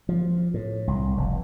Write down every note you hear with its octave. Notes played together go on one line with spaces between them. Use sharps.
F3
A2
C2
F1